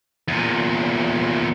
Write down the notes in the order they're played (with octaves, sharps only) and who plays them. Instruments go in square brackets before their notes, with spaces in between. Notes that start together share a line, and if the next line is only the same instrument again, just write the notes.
[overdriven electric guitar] E2 A#2